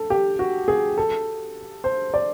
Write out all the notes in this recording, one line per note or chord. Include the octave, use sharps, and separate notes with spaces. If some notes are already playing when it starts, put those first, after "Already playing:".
Already playing: A4
G4
F#4
G#4
A4
C5
D5